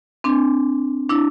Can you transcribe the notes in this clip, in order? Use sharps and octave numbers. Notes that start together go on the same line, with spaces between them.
C4 D4
D4 E4